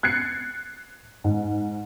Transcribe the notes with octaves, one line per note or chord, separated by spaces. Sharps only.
F#6 G#6 A6 C7 C#7
G#2